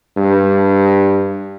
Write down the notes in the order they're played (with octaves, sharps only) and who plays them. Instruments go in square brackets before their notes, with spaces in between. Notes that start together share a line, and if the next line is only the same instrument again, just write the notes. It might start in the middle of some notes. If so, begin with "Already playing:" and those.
[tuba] G2